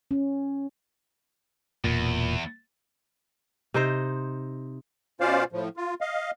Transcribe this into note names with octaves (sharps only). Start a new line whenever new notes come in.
C#4
E1 E2 A#2
C3 D#4 C5
B2 C#4 F4 C5 D5 F5
A2 F3
F4
D#5 F5